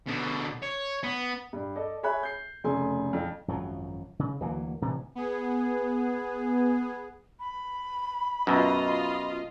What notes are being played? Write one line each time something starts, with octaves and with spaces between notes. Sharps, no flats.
B2 D3
C#5
B3
G2
A4 D5 D#5
G#4 C#5 E5 G#5 B5 F#6
G6 C7
F1 C#3 A3 G#4 G#5 C6
F2
G#1 F#2 F3 F#3
C#3
D2 E3 F#3 A#3
D1 C3 E3
B3 G#4
B5
F#2 B2 F4 D#5